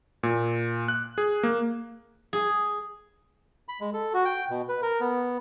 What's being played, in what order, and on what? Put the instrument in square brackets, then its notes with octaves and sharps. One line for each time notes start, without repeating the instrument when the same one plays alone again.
[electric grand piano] A#2
F#6
G#4
A#3
[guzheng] G#4
[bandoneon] B5
G#3
A4
F#4
G5
B2
B4
A#4
B3